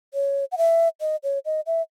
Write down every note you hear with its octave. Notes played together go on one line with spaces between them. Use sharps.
C#5
F#5
E5
D#5
C#5
D#5
E5